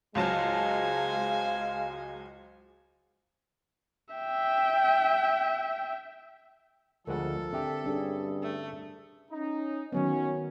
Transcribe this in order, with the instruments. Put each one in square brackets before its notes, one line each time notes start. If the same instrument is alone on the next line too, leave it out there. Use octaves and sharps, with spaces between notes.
[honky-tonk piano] C#2 F#3 A5 [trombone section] G#3 [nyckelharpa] C5 G#5 [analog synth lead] F5
[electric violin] E5 G5
[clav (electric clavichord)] D2 G#3 F#5 [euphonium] F3 [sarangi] A4 [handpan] A#4
[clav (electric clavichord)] D3 G4 [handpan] C4 E5
[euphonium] G2 [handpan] C#4 D4 G#4
[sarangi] A3
[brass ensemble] C#4 D#4
[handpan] D#3 F#3 B3 [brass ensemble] C#4